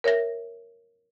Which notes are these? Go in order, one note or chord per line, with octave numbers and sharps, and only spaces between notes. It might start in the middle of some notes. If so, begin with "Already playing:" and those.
A#4 C#5 E5 A#6